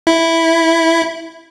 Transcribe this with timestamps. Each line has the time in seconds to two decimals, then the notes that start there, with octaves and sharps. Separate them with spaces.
0.07 E4